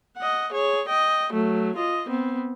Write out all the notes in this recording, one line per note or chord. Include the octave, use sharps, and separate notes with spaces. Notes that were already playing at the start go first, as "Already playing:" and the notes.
D#5 F#5
G#4 C#5
D#5 G5
F#3 A3
F4 D#5
B3 C4